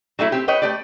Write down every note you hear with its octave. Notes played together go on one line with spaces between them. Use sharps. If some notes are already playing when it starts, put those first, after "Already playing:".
F#3 G3 A3 E4
C4 G4
B4 C#5 D#5 G5
A3 G4 D5